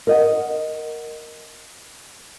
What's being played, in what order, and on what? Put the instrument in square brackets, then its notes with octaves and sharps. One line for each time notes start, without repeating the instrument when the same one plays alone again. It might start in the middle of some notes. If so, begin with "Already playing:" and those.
[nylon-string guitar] A#4 D#5 F#5